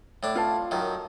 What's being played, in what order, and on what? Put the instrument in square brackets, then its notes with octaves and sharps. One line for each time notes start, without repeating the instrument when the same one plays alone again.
[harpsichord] A2 D4
[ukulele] F4 F5 A5
[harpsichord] F#2 D#3